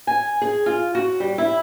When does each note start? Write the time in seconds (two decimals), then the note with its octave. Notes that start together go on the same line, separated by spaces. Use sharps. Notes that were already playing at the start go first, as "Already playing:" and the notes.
0.07 G#5
0.42 G#4
0.66 F4
0.95 F#4
1.20 G3
1.38 E4